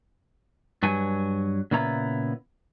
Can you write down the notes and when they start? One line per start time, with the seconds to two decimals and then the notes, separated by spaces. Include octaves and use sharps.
0.83 G2 F#3 G#5
1.71 A#2 C#3 B3 E4 A#5